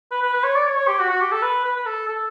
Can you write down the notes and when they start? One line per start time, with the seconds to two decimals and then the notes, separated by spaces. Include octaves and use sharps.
0.12 B4
0.22 B4
0.33 B4
0.44 C#5
0.56 D5
0.66 C#5
0.77 C#5
0.87 G4
0.99 F#4
1.10 F#4
1.21 G4
1.32 A4
1.42 B4
1.65 B4
1.76 B4
1.86 A4
2.08 A4